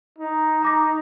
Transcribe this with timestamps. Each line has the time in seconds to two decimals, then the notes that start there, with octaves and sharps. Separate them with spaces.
0.19 D#4
0.62 A#5 D6 A#6